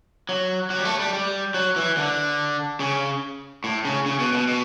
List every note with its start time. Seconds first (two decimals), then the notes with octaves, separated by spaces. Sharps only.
0.29 F#3
0.70 F#3
0.78 G3
0.85 A3
0.99 G3
1.13 G3
1.54 F#3
1.76 E3
1.97 D3
2.80 C#3
3.64 A2
3.85 C#3
4.06 C#3
4.19 B2
4.33 B2
4.48 B2